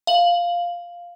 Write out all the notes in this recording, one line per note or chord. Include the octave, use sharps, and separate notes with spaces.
F5 F#7